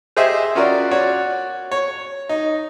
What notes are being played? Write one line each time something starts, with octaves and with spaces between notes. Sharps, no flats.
G4 G#4 C5 D#5 E5
C#4 F4 F#4 A#4 D5
F#4 C#5 D5
C#5
D#4